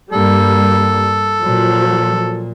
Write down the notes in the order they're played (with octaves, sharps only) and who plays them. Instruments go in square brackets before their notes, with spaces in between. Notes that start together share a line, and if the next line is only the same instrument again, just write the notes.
[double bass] G2 A#3 [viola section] G3 [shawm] A4
[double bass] A#2 [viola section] F3 F#3